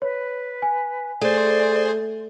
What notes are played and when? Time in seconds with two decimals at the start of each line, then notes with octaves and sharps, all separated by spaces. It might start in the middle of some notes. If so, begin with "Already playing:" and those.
0.02 B4 C#5
0.62 G#5
1.22 A3 G#4 C5 D5